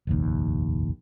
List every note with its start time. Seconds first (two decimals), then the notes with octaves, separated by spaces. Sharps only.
0.07 F1 A#1 D#2